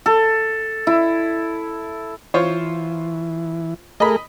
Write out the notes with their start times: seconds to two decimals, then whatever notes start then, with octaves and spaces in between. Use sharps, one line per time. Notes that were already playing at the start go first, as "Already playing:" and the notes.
0.06 A4
0.87 E4
2.34 E3 F4 C5 C#5
4.00 A3 G#4 A#4 D#5 B5